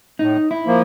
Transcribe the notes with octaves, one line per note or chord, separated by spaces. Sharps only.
A2 D#4
E4
F3 A#3